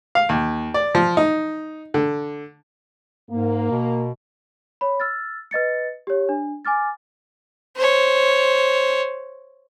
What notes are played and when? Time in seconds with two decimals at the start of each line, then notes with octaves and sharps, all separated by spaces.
0.15 F5
0.29 D#2
0.74 D5
0.95 F3
1.17 D#4
1.94 D3
3.31 G#2 A#3
3.71 B2
4.81 C#5 B5
5.00 E6 F6 A6
5.51 B4 D#5 A6 C#7
6.07 G4 C#5
6.29 D4
6.65 G#5 D6 F6 A6
7.76 C5 C#5